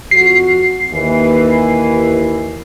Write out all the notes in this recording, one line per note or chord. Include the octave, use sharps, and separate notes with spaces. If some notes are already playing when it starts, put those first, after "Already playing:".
F2 F#4 C7
D#2 E3